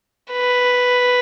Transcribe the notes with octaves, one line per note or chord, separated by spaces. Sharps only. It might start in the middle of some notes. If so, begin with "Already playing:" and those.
B4